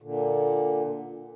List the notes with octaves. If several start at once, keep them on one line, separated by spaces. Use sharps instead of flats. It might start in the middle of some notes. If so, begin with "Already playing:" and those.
A#2 D3